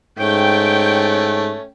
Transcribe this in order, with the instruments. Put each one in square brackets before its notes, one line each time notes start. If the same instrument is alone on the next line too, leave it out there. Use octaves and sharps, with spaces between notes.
[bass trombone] G#2 [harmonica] A3 C#4 [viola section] G5